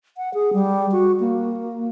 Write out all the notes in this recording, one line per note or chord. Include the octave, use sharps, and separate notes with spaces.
F#5
G#4
G3
F#4
A#3